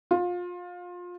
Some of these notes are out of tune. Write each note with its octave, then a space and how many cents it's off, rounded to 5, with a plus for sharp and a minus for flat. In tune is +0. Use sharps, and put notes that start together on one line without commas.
F4 +25